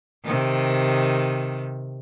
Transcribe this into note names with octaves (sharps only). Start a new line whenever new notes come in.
C3 D#3